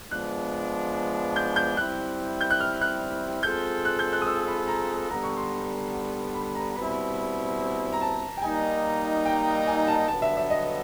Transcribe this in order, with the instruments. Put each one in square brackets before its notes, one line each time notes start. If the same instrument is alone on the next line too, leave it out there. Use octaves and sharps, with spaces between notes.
[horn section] F3 G#3 B3 D4 [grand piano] F#6
[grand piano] G6
G6
[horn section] G3 C4 E4 [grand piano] F#6
[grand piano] G6
F#6
F6
F#6
[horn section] G#3 C4 F4 A4 [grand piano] G6
[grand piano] F#6
G6
F#6
D#6
E6
B5
A#5
[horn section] D3 G3 B3 [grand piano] A#5
[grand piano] C#6
C6
B5
A#5
[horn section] B2 G3 C4 E4 [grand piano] B5
[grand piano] A#5
A5
G5
[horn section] G3 A#3 D#4 [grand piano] G#5
[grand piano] G5
G#5
A5
[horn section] G2 D3 F#3 B3 [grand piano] A5
[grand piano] E5
E5
D#5